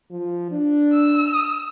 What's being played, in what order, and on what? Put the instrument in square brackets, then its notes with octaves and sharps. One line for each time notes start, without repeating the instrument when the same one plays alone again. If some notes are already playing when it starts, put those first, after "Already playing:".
[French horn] F3
D4
[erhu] E6